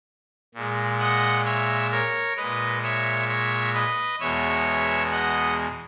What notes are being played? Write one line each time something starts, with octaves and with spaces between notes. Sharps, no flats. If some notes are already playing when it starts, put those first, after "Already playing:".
A#2 G#3
D#5 F#5
C#5 E5
A#4 C#5
A#2 G#3 B4 D#5
C#5 E5
C#5 E5
B4 D#5
E2 B2 G#3 C#5 E5
D#5 F#5